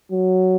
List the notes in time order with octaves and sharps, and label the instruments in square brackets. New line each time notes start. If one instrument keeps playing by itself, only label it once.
[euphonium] F#3